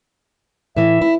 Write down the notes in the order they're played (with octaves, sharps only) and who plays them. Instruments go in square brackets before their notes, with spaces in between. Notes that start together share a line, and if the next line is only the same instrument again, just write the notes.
[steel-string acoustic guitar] A2 E3 [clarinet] E5
[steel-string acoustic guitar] E4